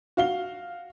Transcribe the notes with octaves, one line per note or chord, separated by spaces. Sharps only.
F#4 F5 G7